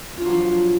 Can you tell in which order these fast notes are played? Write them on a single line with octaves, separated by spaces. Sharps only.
F4 D4 F#3 F3